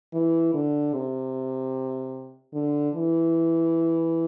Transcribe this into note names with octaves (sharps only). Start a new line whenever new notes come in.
E3
D3
C3
D3
E3